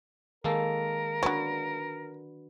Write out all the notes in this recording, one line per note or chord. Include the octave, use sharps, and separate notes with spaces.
D#3 G#3 A#3 A4 A#4
B3 C#4 D4 F#4 B4